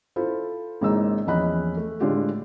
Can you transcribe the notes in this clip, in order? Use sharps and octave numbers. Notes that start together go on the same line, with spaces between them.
E4 F4 A4 C5
G#1 C#3 A#3 D#4 E4 E6
A#1 E2 C#4 D#5 B5 F#6
A3
A2 D3 G#3 F4 G4